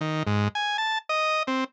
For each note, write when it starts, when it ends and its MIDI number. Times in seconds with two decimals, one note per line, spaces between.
0.01 0.23 51
0.27 0.48 44
0.55 0.77 80
0.78 0.98 81
1.09 1.43 75
1.47 1.64 60